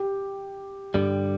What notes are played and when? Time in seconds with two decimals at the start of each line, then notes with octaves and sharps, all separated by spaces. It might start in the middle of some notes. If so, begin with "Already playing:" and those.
Already playing: G4
0.94 G2 D3 G3